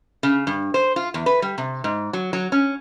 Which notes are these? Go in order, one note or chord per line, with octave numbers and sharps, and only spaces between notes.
C#3
G2
C5
F4
E2
B4
G3
C3
G#2
F#3
F#3
C#4